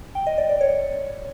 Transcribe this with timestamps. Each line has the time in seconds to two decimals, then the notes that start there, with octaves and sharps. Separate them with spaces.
0.15 G5
0.27 D#5
0.38 D5
0.49 D5
0.61 C#5